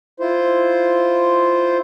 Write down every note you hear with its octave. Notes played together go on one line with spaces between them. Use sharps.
E4 F4 C5